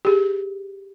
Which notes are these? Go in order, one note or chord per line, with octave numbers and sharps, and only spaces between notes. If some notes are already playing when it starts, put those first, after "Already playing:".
G4 G#4